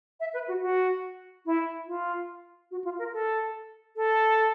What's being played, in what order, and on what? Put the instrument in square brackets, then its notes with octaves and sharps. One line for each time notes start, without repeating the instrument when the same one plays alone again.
[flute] E5
B4
F#4
F#4
E4
F4
F#4
F4
A#4
A4
A4